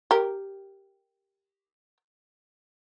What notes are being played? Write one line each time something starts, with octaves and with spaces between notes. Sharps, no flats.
G4 A#4